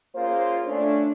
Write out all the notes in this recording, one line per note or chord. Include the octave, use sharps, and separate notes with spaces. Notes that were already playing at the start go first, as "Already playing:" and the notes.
A#3 C#4 F4 G#4 C5
A3 C#4 D4